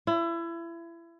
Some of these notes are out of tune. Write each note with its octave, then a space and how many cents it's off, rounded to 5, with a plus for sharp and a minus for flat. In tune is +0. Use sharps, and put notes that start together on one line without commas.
E4 +30